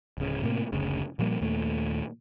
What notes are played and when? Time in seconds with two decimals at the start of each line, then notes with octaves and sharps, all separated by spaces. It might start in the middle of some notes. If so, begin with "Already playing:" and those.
0.18 D1 C#3
0.43 A2 C3 A#3
0.72 F#1 D2 C#3
1.19 A#2 F3 G3 A#3
1.41 D#2 A#2 A3